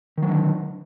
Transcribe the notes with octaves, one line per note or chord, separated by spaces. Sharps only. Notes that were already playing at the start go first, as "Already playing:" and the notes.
D3 D#3 F#3